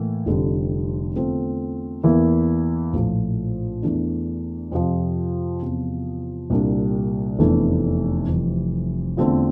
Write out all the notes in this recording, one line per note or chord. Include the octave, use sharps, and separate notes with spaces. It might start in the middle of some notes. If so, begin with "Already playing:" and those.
Already playing: A2 E3 A#3
F1 F2 D3 G3
E2 D3 A3 C4 F4
E2 E3 A#3 E4
A#1 A2 F3
E2 E3 A3 D4
F2 C3 F3
E2 C3 F3
C2 A#2 G3 D4
F1 E2 E3 A3 D4
F1 F2 E3 G3
E2 D3 A3 C4 F4